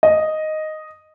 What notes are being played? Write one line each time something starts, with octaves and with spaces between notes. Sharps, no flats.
D#5